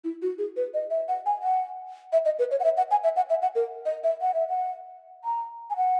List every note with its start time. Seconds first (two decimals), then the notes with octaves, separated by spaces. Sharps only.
0.04 E4
0.22 F#4
0.38 G#4
0.56 B4
0.74 D#5
0.90 E5
1.08 F#5
1.26 G#5
1.43 F#5
2.12 E5
2.25 D#5
2.39 B4
2.51 C#5
2.60 F#5
2.64 E5
2.77 F#5
2.91 G#5
3.04 E5
3.16 F#5
3.30 E5
3.42 F#5
3.55 A#4
3.86 D#5
4.04 E5
4.21 F#5
4.34 E5
4.48 F#5
5.24 A#5
5.70 G#5
5.77 F#5